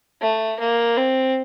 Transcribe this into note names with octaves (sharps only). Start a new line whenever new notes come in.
A3
A#3
C4